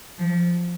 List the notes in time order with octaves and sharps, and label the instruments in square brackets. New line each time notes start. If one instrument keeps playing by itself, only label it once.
[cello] F3